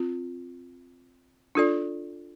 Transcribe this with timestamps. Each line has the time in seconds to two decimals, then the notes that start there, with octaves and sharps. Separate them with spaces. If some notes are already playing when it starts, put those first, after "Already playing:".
Already playing: C4 F4
1.55 D4 F4 A4 D5